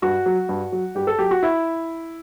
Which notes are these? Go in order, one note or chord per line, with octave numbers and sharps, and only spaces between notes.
G2 F#4
F#3
G2
F#3
G2 G4
A4
F#3 G4
F#4
E4